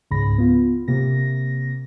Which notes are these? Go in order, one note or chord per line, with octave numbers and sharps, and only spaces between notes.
C#2 G#2 C#3 B5 A#6
B3 F4
C3 A#3 A#6